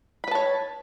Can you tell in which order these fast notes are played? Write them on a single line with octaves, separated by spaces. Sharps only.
B5 B4 A5 C#5